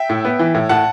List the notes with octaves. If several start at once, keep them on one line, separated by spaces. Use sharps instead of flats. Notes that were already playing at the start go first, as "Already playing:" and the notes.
Already playing: E5 G5
A2
B3
E3
A2
A2 F#5 A5